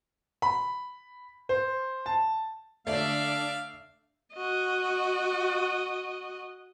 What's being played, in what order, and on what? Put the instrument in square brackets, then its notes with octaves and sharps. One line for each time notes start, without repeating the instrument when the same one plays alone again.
[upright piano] B5
C5
A5
[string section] D3 D4 [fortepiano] A3 [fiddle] D5 E5 [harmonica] F5
[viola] F#4 D#5